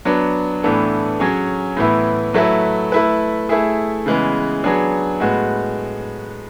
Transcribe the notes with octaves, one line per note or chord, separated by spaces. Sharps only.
F#3 B3 D4
A2 E3 B3 D4 A4
F#3 C#4 G#4
A2 E3 B3 E4
F#3 A3 E4 B4
A3 E4 B4
A3 E4 G#4
C#3 E3 G#3 B3
F#3 B3 D4 G#4
A2 G#3 B3 F#4